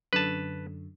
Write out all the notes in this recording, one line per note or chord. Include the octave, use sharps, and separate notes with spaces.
F#2 D3 B4 A5